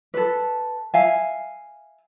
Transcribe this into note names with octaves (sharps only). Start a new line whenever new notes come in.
A4 B4
E5 F5 G#5